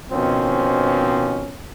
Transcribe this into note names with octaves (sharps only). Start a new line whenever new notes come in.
B2 D#3 F3 C4 C#4